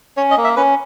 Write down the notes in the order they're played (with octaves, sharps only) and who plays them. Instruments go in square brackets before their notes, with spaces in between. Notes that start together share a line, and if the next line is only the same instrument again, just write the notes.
[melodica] C#4 C#5
D#5
A#3
E5
C#4 B4